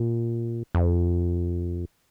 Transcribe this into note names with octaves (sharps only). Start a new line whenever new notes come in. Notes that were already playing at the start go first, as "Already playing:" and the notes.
Already playing: A#2
F2